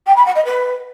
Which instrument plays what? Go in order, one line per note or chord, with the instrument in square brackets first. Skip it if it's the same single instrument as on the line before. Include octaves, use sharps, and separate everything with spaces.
[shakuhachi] G5
B5
F#5
D#5
B4